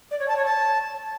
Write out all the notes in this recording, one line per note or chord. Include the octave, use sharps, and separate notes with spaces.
D5
C#5
A5
C#5
A5